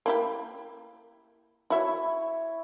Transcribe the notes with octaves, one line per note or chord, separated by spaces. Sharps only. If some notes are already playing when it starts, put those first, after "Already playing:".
A#3 E4 G4
E4 F#4 C#5 E5